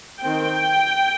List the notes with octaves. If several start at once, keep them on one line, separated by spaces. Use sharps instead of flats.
D#3 C4 G5